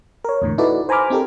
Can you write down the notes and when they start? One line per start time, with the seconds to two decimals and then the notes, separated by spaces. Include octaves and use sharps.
0.24 A#4 C#5
0.42 E2 A2 D3
0.58 D#4 E4 F#4 A4 B4 D5
0.89 C5 G#5 A#5 B5 D6 F6
1.10 C4 D#4 G4 A4 A#4